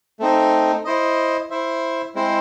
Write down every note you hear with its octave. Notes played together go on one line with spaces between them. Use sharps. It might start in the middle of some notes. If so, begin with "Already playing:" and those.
A3 C4 D#4
E4 C5 D#5
E4 C5 E5
G#3 C4 E4 C5